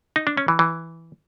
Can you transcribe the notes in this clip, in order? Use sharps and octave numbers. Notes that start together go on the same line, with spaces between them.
D#4
D4
C#4
E3
E3